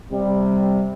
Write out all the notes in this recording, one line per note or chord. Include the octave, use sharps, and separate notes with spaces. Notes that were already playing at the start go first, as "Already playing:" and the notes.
C3 G3